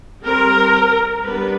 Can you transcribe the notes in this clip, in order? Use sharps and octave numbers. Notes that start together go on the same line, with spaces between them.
G3 C4 A#4
G3 B3 D4 B4